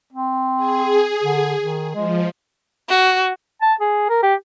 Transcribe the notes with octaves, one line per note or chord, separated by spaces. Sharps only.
C4
G#4
D3
D#3
F3 G#3
F#4
A5
G#4
A#4
G4